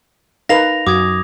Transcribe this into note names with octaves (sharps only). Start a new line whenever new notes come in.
D#4 A#4 B4 F5 A#6 F7
F#2 F#4 D6 D#6 G#6